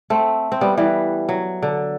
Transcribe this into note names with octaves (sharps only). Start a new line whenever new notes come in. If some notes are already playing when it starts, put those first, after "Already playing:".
A3 C4
C4
G3 B3
E3 G3
F#3
D3